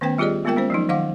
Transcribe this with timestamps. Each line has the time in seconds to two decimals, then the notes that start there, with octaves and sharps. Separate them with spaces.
0.01 D#3 A3 B3 C#4 B4 G5
0.18 G3 F4 G4 G#4 D5 D#5
0.45 G#3 A#3 B3 F4 A#4 G5
0.56 G#3 C#4 C5
0.70 F3 F#3 D#4
0.89 D#3 F#3 F5 F#5 D6